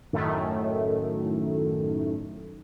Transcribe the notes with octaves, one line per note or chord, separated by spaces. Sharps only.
F#2 A2 D#3 A3